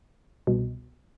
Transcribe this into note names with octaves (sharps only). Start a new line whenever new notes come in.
C2 B2